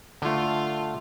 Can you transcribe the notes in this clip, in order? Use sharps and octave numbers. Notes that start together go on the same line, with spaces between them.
D3 A3 F4